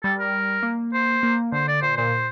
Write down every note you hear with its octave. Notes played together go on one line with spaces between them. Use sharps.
G3 A4
A#4
A#3
C5
A#3
D3 C5
D5
A#2 C5
A#2 C5